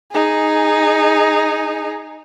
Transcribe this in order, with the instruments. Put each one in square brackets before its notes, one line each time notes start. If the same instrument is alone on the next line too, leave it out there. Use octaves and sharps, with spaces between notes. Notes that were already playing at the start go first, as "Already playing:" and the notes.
[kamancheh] D#4 G#4